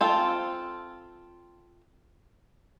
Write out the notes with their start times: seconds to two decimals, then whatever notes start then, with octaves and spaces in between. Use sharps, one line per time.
0.01 C4 F4 A4